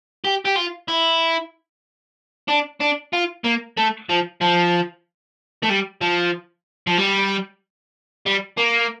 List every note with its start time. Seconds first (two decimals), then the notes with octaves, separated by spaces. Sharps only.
0.24 G4
0.45 G4
0.56 F4
0.88 E4
2.49 D4
2.81 D4
3.13 F4
3.44 A#3
3.77 A3
4.09 F3
4.41 F3
5.63 A3
5.69 G3
6.01 F3
6.87 F3
6.98 G3
8.26 G3
8.58 A#3